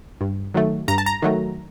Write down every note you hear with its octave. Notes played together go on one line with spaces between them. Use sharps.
G2
D#3 F#3 A3
G2 A#5
A5
A#5
D#3 F#3 A3